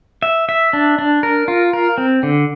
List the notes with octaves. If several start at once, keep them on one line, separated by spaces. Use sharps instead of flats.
E5
E5
D4
D4
A#4
F4
A#4
C4
D3